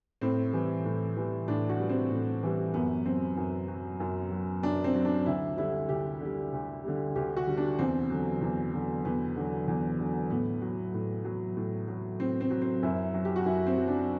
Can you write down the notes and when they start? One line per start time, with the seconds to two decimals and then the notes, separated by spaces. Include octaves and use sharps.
0.21 A2 C4
0.53 E3 G3
0.85 A2
1.17 E3 G3
1.48 A2 D4
1.69 F#4
1.79 E3 G3
1.89 C4
2.11 A2
2.43 E3 G3
2.74 F#2 B3
3.06 F#3 C4
3.37 F#2
3.68 F#3
4.00 F#2
4.31 F#3
4.63 F#2 D4
4.84 C4
4.94 F#3
5.05 D4
5.26 D2 E4
5.57 D3 G3 E4
5.89 D2 G4
6.20 D3 G3
6.53 D2
6.84 D3 G3
7.16 D2 G4
7.37 F#4
7.47 D3 G3
7.57 D4
7.79 E2 C4
8.10 D3 F#3
8.41 E2
8.73 D3 F#3
9.05 E2 B3
9.36 D3 F#3
9.68 E2
9.99 D3 F#3
10.30 A2 B3
10.62 F#3
10.94 A2
11.25 F#3
11.57 A2
11.88 F#3
12.20 A2 C4
12.41 C4
12.51 F#3
12.62 C4
12.83 F#2 E4
13.14 F#3
13.25 G4
13.36 F#4
13.45 F#2 E4
13.67 C4
13.78 F#3
13.88 D4